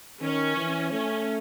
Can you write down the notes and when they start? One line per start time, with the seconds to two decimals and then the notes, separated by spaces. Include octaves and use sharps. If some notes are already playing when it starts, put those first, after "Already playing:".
0.22 D#3 C#4
0.57 E3
0.92 A3 C#4